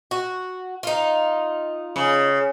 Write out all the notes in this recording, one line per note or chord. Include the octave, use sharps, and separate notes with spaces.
F#4
D#4 F4
C#3